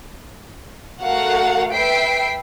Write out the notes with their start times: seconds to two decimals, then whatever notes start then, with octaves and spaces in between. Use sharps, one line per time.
1.02 A3 F#4 A#4 F5 F#5
1.72 B4 E5 G5 B6 C7 D7